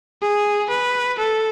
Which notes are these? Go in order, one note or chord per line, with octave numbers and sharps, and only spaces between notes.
G#4
B4
A4